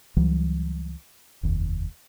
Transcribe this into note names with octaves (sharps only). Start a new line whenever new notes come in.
C#2 E3 F#3 G3
F1 D#2